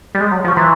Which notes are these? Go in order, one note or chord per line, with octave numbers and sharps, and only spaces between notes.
G3
G#3
F#3
F3
C#6
E3 A#5 C6